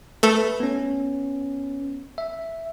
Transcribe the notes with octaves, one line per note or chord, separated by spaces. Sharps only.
A3 A4 B4
B3 C#4
E5